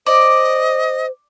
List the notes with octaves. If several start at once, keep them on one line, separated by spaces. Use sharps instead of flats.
C5 D5 D#5